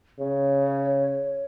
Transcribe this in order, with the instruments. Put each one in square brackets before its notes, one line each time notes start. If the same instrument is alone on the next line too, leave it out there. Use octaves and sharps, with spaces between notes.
[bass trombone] C#3 [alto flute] C#5